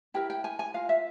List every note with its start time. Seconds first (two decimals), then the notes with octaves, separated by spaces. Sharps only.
0.14 E4 G4 A#4 G5
0.30 G5
0.44 G#5
0.59 G#5
0.74 F4 A#4 F5
0.89 E5